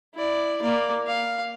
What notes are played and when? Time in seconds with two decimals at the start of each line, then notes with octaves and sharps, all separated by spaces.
0.15 E4 D5
0.62 A#3 D5
1.07 F5